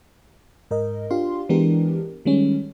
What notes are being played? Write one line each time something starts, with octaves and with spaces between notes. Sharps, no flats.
G#2 A#4 D#5
D4 F4 G4 F5 C6
E3 G#3 B3 D4 G4 A#4
D#3 G3 G#3 C#4